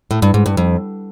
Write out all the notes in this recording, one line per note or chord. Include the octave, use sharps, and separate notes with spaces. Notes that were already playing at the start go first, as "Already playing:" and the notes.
A2
G2
G#2
G2
F2